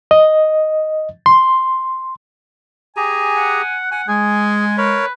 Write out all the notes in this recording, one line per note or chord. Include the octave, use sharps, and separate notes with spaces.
D#5
C6
G4 G#4 G#5 A#5
F#5
F#5 G#5
G#3 G#4 G#5
A#4 B4 C#5